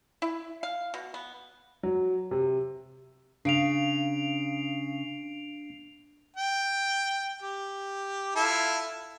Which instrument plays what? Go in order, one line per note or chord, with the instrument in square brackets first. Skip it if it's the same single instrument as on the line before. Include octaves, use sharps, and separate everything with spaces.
[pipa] E4
F5
B2
B3
[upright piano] F#3
C3
[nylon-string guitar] C#3 [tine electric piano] D4 F5 [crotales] C7 D7 F7
[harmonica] G5
G4
E4 F4 A4